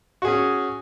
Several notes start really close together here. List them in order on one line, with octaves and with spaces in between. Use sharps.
F#4 G#4 C#4